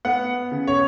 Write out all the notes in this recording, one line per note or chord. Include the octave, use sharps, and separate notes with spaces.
B3 F#5
C#3
C#5